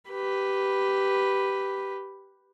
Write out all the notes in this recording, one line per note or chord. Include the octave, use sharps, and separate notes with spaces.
G4 B4